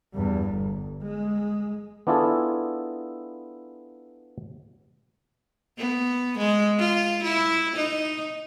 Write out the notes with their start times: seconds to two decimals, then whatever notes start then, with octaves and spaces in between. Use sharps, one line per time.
0.14 E2 G2
0.50 G1
1.03 G#3
2.07 B3 D4 E4 F4 G#4 A4
5.78 B3
6.38 G#3
6.78 F4
7.23 E4
7.75 D#4